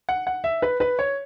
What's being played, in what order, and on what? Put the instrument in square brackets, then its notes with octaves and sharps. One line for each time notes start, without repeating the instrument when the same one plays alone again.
[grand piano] F#5
F#5
E5
B4
B4
C#5